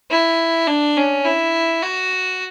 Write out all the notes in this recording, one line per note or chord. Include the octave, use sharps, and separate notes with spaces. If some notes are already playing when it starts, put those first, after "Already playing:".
E4
D4
C#4
E4
F#4